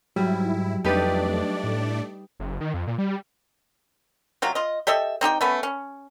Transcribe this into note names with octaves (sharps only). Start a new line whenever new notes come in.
G#2 F#3 G3 E4
F2 A3 D4 D#4 G4 B4 D5
A2
F#1
D#3
F2
A#2
G3
C3 F#3 F4
F4 D#5
G4 A4 D#5 E5
C4 D#4 G4 G5
A3 B3 C#4
C#4